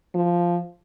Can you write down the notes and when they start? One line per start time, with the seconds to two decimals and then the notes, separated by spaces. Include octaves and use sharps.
0.15 F3